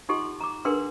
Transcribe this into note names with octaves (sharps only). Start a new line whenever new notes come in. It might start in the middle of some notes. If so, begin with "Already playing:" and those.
D#4 F4 G4 A4 F#5 C6
A#5 D6
D4 G#4 A#4 B4 F#5 C6